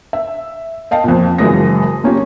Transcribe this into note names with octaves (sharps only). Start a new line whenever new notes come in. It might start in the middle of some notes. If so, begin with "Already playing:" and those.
E5
D#5 F5 G5 A5
F2 A#2
F#1 F#2 E3 G#3 D#6 A#6
A#3 C#4 F4 G4